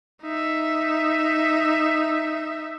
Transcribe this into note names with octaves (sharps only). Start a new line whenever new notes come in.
D#4 E5